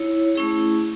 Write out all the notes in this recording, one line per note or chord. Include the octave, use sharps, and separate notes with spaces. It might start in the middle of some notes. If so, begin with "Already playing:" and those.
Already playing: E4 C#5
A3 C#4 E4 G#4